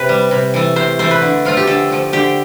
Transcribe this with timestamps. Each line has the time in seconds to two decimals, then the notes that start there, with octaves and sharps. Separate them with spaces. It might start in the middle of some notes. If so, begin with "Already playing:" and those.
Already playing: C3 B4
0.09 G3
0.31 C3
0.54 E3 A3
0.76 C3 C5
0.99 E3 A3 C5
1.11 B4
1.22 D3
1.45 F3 A3 F4
1.57 G4
1.67 D3 A4
1.90 F3 A3
2.13 D3 G4